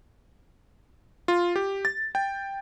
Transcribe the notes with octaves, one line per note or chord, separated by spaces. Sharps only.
F4
G4
A6
G5